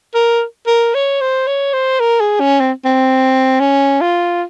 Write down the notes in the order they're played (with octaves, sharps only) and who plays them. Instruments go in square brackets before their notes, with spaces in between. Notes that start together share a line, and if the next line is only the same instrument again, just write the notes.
[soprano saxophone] A#4
A#4
C#5
C5
C#5
C5
A#4
G#4
C#4
C4
C4
C#4
F4